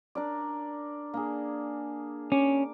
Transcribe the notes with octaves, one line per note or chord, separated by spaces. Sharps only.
D4 A#4 D5
A#3 D4 G#4
C#4 D6